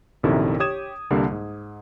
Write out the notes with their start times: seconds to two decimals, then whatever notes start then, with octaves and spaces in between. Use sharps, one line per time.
0.23 A#1 F#2 C3 D#3 E4 A4
0.60 G4 C#5 D#6 G#6 E7
1.10 C2 D3 G3 A#3
1.31 G#2